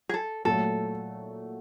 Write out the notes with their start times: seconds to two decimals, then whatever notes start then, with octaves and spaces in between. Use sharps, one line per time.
0.09 G#4
0.14 A4
0.45 A#2 F#3 A3 A4